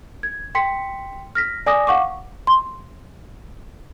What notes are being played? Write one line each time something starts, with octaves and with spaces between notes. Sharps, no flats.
G#6
G5 C6 B6 C#7
F6 A#6 B6
D5 G#5 D6 D#6 A#6
F5 F#5 C#6 D6
C6